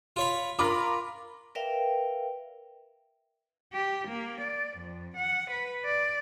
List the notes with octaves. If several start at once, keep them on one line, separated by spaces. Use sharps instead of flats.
F4 C#5 B5
F4 A#4 B5 D6
A#4 B4 D5 E5 F5 G5
G4
A#3
D5
F2
F#5
B4
D5